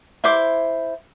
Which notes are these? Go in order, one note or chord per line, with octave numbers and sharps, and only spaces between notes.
E4 C5 D6